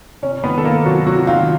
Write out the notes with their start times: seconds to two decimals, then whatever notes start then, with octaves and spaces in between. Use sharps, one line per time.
0.22 C3 C#4 C#5
0.44 D#3 B3 B4
0.58 A4
0.65 D#3 A#3 A#4
0.85 C3 F#3 F#4
1.06 C3 F#3 F#4
1.19 F#4
1.27 D#3 F4